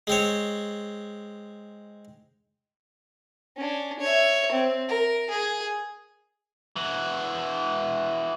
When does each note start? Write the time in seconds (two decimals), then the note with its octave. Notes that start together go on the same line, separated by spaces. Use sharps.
0.07 G#3 C4 C#5
3.57 C#4 D4
4.00 C#5 E5
4.52 C4
4.88 A#4
5.30 G#4
6.76 E3 F#4